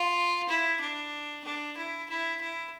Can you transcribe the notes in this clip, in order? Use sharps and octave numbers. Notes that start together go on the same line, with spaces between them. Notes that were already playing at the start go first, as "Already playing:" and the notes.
Already playing: F4
E4
D4
D4
E4
E4
E4